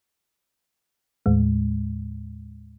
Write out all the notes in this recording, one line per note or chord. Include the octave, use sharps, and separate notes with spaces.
D#2 A2 G#3